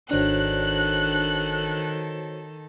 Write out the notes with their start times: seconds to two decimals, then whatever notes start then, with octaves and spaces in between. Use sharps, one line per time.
0.11 G#1 D#3 D4 F#4 A4 C5 C#5 F#6